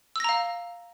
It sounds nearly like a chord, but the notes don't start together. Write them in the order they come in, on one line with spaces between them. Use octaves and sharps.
E6 A#6 A#5 F5